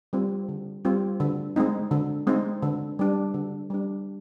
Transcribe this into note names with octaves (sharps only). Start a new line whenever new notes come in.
G3 C4 F4
D3
G3 C4 F4
D3
G#3 C4 D#4
D3
G#3 C4 D#4
D3
G3 D4
D3
G3 D4